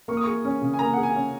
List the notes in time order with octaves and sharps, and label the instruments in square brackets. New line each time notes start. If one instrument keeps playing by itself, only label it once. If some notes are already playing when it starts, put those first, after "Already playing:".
[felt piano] A#3 [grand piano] C#6
[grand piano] D#6
[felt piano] G#4 [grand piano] C#6
[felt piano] C#4
C#3
[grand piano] G#5
[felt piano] A#3 [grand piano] A#5
[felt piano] G#4 [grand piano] F#5
[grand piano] G#5
[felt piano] C#4